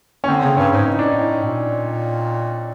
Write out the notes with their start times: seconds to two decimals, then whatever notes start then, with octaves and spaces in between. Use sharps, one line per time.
0.24 C#4
0.28 D3 C4
0.43 C#3 C4
0.57 G2 C#4
0.72 G#2
0.86 A2 D#4
0.99 D4
1.11 A2 D#4
1.44 A#2